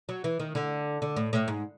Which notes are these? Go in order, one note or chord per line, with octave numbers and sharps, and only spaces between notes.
F#3
E3
D#3
D3
D3
A2
A2
G#2